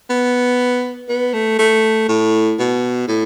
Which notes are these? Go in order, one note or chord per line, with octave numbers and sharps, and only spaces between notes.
B3
B3
A3
A3
A2
B2
A2